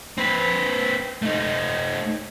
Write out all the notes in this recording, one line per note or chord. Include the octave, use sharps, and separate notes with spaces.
C4 B4
A3 D#4